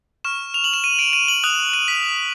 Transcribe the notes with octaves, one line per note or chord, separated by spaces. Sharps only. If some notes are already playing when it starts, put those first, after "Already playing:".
C#6 F6 E7
F7
F#7
E7
D#7
D7
D#7
F#7
D#6 F#6 F7
D#7
B6